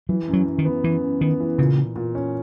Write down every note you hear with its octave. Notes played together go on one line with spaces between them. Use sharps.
E3 F#3
F#2
F#3
F#2
D#3
B3
F#2 E3
F#2
D#3 B3
E3
A#2 C#3
A#2
A#2
C#4